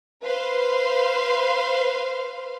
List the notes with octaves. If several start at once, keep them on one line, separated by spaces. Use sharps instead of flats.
B4 C5 F5 C6